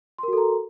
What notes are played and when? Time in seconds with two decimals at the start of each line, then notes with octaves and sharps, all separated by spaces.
0.18 C6
0.23 A#4
0.28 F#4
0.33 A4
0.38 A#5